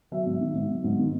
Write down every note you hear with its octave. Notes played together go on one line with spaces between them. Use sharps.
F#3 E5
G#2
D#3
G#2
F#3
G#2
D#3